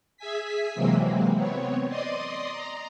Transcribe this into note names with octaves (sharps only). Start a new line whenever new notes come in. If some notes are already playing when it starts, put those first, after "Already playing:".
G#4 E5 G#5 B6
C3 E3 F#3 G#3 A#3 C4
B3 C4 C#5
D5 D#5 C6 D#6
A#5